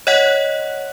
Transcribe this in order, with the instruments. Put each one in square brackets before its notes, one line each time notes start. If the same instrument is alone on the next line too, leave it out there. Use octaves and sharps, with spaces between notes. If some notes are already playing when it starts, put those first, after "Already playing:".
[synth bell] C#5 D#5 F#5 F#6